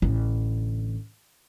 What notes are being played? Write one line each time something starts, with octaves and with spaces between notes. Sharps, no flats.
A1 D3